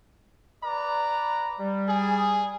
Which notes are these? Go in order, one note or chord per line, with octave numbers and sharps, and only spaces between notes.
B4 D5 A#5
G3
G#4